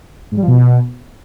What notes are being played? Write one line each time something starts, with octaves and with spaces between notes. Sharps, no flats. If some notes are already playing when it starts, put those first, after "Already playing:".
G#2
G3
F3
B2